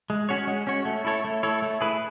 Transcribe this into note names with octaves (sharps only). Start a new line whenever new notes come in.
G#3
C#4 F#4 C#5
G#3
C#4 F#4 C#5
A3
E4 A4 C#5
A3
E4 A4 C#5
A3
E4 G#4 B4